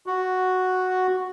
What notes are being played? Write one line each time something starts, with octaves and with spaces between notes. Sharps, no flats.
F#4